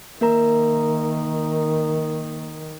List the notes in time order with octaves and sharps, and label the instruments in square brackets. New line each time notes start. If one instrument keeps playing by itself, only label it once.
[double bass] D#3 [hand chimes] A#3 A#4 A#5